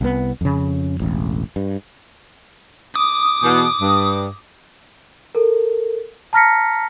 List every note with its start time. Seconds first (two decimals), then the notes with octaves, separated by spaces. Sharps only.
0.01 C2 B3
0.41 F2 C#3
1.00 E1 A1
1.56 G2
2.95 D6 D#6
3.44 E2 B2
3.81 G2
5.35 A4 A#4
6.33 A5 A#5 F6 A#6 B6 C#7